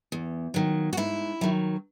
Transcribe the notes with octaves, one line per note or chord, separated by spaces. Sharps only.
E2
D#3 F#3
F#4
G#2 E4
D#3 F#3